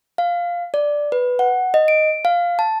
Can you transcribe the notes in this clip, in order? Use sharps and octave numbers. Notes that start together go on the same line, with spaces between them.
F5
D5
B4
F#5
D#5
D7
F5
A5